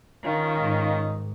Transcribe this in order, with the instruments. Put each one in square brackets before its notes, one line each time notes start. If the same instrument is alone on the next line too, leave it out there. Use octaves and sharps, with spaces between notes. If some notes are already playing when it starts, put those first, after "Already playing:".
[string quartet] D#3 [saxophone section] C#4 D#4 F4
[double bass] G#2